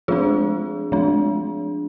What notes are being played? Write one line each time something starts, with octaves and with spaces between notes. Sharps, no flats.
F3 G#3 D4 F4 G#4
F3 G#3 D4